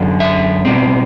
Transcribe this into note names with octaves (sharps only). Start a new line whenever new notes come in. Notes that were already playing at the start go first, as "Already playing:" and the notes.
Already playing: F#2 D3
E5
B2 G3 C4